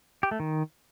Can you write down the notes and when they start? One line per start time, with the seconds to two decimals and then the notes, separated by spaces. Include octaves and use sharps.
0.23 G4
0.31 A3
0.40 D#3